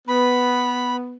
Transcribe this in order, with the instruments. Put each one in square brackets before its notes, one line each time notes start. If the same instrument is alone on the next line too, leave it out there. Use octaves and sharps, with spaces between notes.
[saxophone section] B3 [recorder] B5